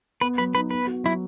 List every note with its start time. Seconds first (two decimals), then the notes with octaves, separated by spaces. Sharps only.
0.21 B3 B4
0.38 F#3 B4
0.54 D#4 B4
0.70 B3 B4
0.87 F#4
1.04 F#3 E4